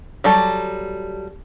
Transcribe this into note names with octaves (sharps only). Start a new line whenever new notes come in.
F#3 G3 A4